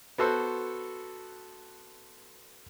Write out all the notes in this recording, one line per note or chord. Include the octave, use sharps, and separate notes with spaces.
B3 F#4 A4 C5